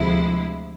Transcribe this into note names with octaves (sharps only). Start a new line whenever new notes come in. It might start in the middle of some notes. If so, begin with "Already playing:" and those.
Already playing: D2 C3 F3 G#3 E4